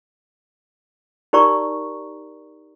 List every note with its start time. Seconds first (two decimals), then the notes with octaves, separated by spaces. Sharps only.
1.33 D#4 G4 A#4 D5 A#5 C#6